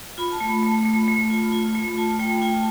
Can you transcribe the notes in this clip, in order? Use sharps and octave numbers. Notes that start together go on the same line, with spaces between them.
F4 B5
A5
A3
B5
A3
A3
A3
F4
F4
A3
F4 A5
A3 G5
F4 G5
A5